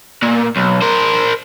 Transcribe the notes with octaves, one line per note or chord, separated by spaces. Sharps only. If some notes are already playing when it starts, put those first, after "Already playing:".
A#2
B1
A#4 C5